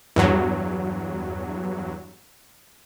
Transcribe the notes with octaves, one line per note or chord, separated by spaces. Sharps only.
E2 G2 F#3